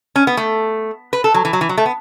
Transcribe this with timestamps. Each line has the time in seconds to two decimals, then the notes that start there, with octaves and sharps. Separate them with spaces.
0.16 C#4
0.27 B3
0.37 A3
1.13 B4
1.24 A4
1.34 F#3
1.45 E3
1.53 F#3
1.61 E3
1.69 F#3
1.77 A3
1.85 B3